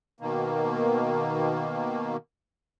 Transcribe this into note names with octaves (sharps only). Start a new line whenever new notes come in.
B2 D#3 A#3